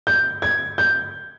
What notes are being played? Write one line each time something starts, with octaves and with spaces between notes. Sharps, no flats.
G6
G#6
G6